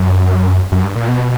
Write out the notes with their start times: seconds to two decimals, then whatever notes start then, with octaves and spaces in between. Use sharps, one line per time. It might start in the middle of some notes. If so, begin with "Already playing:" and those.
Already playing: F#2
0.72 F#2
0.84 G2
0.96 A#2
1.08 B2